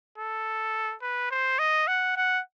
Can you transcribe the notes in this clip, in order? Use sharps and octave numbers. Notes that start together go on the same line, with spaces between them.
A4
B4
C5
D#5
F#5
F#5